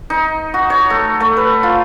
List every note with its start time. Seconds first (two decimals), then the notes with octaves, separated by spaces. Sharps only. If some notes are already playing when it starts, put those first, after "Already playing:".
0.10 D#4
0.54 F#4
0.70 C#5
0.90 A3
1.20 A3
1.37 B4
1.63 F4